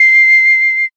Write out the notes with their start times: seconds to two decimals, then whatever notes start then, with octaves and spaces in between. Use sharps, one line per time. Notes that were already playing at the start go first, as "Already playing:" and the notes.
Already playing: C7